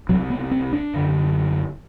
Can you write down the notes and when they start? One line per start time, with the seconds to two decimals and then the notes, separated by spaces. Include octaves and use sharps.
0.09 C2 C3 F#3
0.30 B3
0.51 C4
0.73 D4
0.94 F#2 D3